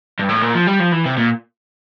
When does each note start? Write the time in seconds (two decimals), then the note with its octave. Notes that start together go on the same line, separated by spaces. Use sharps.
0.20 G2
0.29 A2
0.42 A#2
0.55 F3
0.67 G3
0.80 F3
0.92 E3
1.06 C3
1.17 A#2